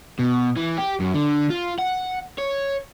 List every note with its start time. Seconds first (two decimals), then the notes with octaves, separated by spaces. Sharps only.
0.19 B2
0.57 E3
0.78 G4
1.00 F#2
1.14 D3
1.50 F4
1.79 F#5
2.38 C#5